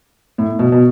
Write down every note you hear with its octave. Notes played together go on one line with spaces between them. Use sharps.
A2
B2
B2